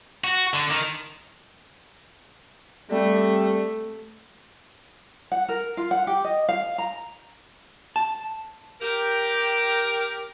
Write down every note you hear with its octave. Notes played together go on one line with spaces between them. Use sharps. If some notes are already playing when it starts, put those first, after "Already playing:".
F#4
D3
D#3
G3 A3 C4
F#5
A#4
F4
F#5
G4
D#5
F5
A#5
A5
G4 A#4